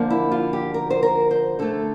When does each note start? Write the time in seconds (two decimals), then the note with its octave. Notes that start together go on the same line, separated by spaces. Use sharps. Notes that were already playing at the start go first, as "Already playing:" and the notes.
Already playing: D3 F3 A#3
0.10 E4
0.32 F4
0.53 G4
0.74 A#4
0.90 C5
1.03 A#4
1.31 C5
1.59 D3 A3 A4